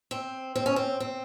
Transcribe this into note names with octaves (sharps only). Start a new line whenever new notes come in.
C4
C4
C#4
C4
C4